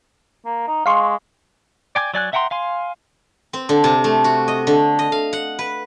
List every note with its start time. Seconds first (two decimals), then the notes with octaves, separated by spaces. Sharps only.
0.46 A#3
0.67 D#4
0.86 G#3 F5 C6 C#6
1.95 D5 G5 G#5 D6
2.14 F#3 D5 G#5 F#6
2.33 E5 F#5 G5 A#5 C6
2.51 F5 G#5 C6
3.53 C4
3.69 D3
3.84 C3
4.04 A3
4.24 F#4
4.48 D#5
4.67 D3
4.99 D#5
5.12 F5
5.33 F#5
5.59 B4